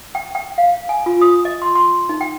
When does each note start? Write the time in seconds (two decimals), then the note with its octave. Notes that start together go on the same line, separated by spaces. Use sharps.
0.15 G5
0.35 G5
0.58 F5
0.89 G#5
1.06 F4
1.21 D#6
1.45 D#5
1.62 C6
1.75 C6
2.09 D#4
2.21 G5